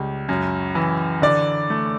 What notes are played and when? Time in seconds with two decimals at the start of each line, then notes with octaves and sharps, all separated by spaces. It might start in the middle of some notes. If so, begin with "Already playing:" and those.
Already playing: C#2 G3
0.29 F#2
0.75 E3
1.22 D3 D5
1.70 A3